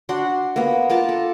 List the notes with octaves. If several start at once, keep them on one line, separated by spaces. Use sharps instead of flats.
D4 F#4 F#5 C6
A#3 B3
F4 A#4 D5 A5
A4